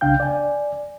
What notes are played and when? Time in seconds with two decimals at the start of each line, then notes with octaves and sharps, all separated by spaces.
0.01 C2 C#3 D4 F5 G5 G6
0.20 D5 G#5